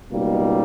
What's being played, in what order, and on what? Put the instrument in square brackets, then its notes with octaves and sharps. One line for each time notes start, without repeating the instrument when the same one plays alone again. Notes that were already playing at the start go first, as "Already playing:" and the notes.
[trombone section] C#2 B2 G3 A#3 D#4